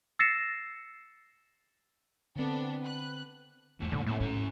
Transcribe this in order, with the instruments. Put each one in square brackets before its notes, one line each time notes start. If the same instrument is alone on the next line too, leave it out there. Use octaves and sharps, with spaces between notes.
[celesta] E6 A6 A#6 C7 C#7 E7
[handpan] D3 C4 [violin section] B3 D4 A4
[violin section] B4 F#6
[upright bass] E2 [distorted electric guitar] G#2 A3
[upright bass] A#2 [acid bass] D3
[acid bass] A2 [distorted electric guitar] A3 C4
[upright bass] G#2 [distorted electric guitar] C#4 A#5